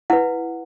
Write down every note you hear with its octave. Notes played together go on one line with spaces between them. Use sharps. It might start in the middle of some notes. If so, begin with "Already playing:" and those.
E4 B4 F#5